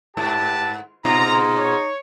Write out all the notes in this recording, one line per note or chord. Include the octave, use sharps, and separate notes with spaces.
G#2 G4 B4 A5
G#2 B2 D#4 F4 A#5
C#5